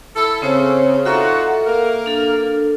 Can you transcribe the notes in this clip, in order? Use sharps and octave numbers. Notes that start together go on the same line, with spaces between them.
E4 A4
C#3 C4 C5 C#5
D#4 F4 F#4 A4 E5 A#5
A#3 A#4
D4 A4